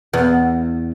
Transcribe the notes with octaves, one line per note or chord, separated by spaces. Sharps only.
E2 B3